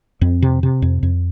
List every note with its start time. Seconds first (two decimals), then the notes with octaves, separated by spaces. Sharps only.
0.21 F2 C4
0.42 C3
0.63 C3
0.82 F2
1.03 F2